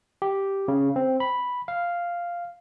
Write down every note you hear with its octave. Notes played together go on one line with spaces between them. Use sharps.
G4
C#3
C4
B5
F5